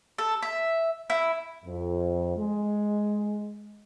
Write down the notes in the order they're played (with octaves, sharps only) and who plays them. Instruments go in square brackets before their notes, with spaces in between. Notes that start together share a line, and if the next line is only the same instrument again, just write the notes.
[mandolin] A4
E5
E4
[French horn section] F2
G#3